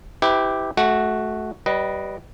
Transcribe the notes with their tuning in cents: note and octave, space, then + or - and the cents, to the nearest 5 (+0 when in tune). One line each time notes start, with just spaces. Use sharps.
E4 -25 G4 +0 B4 +40
A3 -25 F#4 +0
G3 -25 B4 +0 D#5 +0